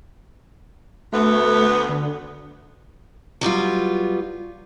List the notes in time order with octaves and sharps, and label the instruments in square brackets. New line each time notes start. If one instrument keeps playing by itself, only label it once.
[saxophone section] D2 B3 [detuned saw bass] A3
[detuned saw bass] D3
[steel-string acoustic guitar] F#3 G3 B3 F4